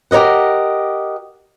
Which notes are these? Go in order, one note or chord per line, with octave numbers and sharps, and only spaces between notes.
G4 A#4 C#5 D#5 F#5